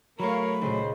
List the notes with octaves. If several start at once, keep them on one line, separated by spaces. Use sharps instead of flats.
F#3 A3 A#4 C#5 F5 B5
C#2 A#2 C5